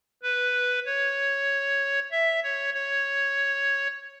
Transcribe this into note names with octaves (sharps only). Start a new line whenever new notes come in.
B4
C#5
E5
C#5
C#5